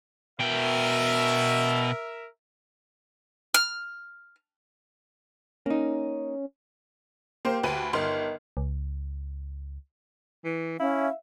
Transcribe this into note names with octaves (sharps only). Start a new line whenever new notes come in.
B2 A#4 E5 G5
F6
A#3 C#4 D#4
A#3 G4 C5
D2 B4 D#7
G1 D#3 C6 F6
C#2
E3
C#4 E4 E5 F5